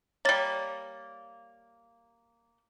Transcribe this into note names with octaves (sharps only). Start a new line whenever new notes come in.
G3 A#3 C#5 A6